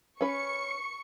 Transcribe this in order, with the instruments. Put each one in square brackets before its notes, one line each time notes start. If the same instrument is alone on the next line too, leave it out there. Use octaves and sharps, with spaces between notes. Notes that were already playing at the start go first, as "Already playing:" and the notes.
[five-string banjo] C#4 B4 [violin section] C#6 C#7